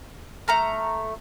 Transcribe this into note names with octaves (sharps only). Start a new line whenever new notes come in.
A3 A#5 F6